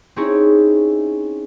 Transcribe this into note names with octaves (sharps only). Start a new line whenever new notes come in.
C4 C#4 D#4 E4 G#4 C#5